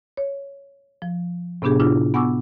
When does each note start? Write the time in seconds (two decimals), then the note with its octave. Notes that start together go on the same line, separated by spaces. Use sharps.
0.17 C#5
1.02 F3
1.62 A2 C3 B3 D4 G4 G#4
1.80 D4 E4 F4
2.14 B3 F#5 G#5 C#6 D6 E6